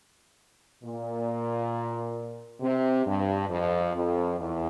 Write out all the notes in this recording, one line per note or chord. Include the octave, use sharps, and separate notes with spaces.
A#2
C3
G2
F2
F2
E2